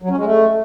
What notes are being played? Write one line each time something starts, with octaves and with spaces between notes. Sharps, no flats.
F#3
C#4
G#3
A3